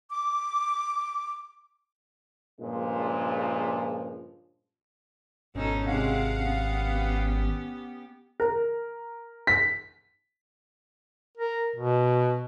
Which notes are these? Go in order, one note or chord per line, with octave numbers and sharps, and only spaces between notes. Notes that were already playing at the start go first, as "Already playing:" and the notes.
D6
G2 A#2 C#3 F3 G#3
G#1 B2 C#4 D#4 A4
C3 G#3 F5 F#5
B3 C#4 G4
A#4
B6
A#4
B2